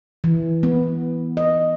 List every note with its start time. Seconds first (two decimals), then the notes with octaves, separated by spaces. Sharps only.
0.24 E3
0.63 B3
1.37 D#5